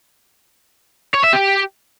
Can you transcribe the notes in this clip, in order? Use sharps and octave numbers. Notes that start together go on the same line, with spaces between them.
C#5
E5
G4